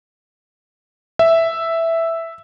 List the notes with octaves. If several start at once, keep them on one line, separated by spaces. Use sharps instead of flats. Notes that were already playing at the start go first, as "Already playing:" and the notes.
E5